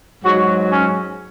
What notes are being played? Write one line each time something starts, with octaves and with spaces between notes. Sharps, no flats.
G#2 F#3 F#4
C#4